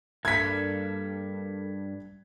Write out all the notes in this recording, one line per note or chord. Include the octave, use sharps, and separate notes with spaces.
G2 A#3 A4 G#6 B6